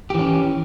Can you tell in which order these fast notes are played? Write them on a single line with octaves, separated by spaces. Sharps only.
G4 E3 C#4